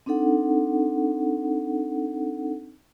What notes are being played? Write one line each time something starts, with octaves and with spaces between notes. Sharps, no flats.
C4 D4 D#4 A4 F#5